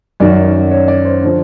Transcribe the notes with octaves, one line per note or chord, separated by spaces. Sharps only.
F#2 D#3 F#3 D5
C#5
D5
C5
D3 F3